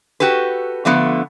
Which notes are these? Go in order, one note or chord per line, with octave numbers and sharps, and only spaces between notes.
F#4 G4 A4 B4
D3 F3 A3 B3